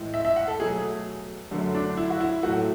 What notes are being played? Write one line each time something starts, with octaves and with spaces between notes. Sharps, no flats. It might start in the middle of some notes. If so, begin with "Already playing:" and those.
Already playing: A2 E3 G#3
E5
E5
F#5
A4
B2 F#3 A3 G#4
F#2 D3 F#3 A3
D4
E4
F#4
E4
A2 F#3 A3 F#4